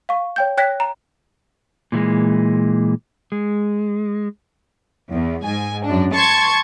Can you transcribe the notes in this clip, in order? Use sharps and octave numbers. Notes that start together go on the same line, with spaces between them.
F5 C#6
C#5 G5 G6
C#5 G5 F#6 G#6 A#6 B6
A#5
A#2 E3 G3 G#3
G#3
E2
G#2 G#5
F#2 D4
A5 C6 C#6 G#6